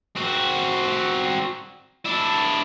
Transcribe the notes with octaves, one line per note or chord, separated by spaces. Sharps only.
C4 F#4
D4 E4